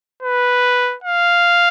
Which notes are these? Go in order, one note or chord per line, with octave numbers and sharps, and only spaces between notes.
B4
F5